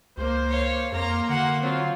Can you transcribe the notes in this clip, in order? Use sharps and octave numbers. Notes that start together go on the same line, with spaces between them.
C#2 A#3 C5
C#5 F5
F2 A#3 A#5 C6
D3 F#4 F#5
F#3 C4 F4